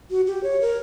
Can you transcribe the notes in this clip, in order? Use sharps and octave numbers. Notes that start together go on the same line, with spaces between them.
F#4
G4
C#5
A#4